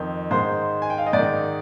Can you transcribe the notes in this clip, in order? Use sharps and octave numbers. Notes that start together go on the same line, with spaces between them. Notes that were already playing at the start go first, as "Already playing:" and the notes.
Already playing: F2 D#3
G#2 D#3 C5 C6
G#5
G5
F5
D#5
G#2 D5
D#3